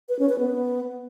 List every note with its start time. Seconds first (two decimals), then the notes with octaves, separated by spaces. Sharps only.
0.09 B4
0.19 C#4
0.29 B4
0.39 B3